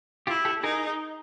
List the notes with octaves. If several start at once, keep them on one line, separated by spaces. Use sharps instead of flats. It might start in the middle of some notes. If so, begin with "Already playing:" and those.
E4 F4 G4
G4 A4
D#4 G#4 A#4